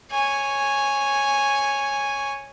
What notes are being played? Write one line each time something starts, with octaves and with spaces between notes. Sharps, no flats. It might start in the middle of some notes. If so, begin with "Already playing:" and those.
C#5 G#5